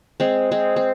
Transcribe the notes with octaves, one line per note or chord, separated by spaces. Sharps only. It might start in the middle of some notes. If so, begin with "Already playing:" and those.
G#3 C4
G#3 C4
C4